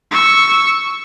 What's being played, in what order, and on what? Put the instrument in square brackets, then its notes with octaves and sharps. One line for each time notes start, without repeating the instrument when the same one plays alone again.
[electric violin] C#6 E6